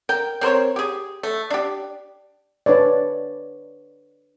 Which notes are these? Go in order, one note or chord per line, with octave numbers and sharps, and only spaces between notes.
A#4 G5
C4 A#4 C5 C#5
G4 G#4
A3
D4 G4
D4 B4 C#5 D5